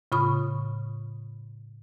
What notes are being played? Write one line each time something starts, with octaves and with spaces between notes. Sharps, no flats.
A2 C#3 F4 B5 C#6 D#6